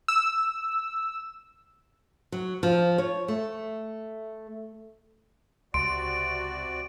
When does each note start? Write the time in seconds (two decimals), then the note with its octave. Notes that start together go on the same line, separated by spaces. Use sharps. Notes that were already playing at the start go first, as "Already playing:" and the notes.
0.08 E6
2.32 F#3
2.63 F3
2.98 C#5
3.28 A3
5.74 C#2 C3 F#4 D5 C6 D7